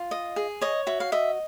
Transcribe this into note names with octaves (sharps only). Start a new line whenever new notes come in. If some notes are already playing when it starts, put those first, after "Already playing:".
Already playing: F4
D#5
G#4
C#5 D#5
F#4 E5
F5
D#5 E5